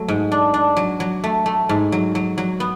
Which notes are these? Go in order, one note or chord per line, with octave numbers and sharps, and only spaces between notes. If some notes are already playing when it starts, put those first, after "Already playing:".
Already playing: F#3 A3
G#2
D4
D4
F#3
F#3
A3
A3
G#2
F#3
F#3
F#3
B3